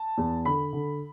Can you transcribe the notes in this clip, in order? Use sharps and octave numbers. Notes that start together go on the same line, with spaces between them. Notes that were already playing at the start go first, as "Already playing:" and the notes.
Already playing: A5
E2
D3 B5
D3